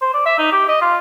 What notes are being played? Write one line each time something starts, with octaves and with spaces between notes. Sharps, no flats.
C5
D5
E5
D#4
G4
D#5
F4